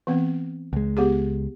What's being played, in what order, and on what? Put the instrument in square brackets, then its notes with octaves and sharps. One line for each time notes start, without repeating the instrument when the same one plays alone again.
[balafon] E3 B3 C4
[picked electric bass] C#2 G#3
[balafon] B3 G4 G#4